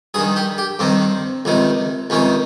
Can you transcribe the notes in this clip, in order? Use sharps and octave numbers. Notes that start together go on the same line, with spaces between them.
G2 D#3 G#4
G4
G4
G2 D#3 C4
C#2 C3 D#3
C#2 C3 D#3 C#4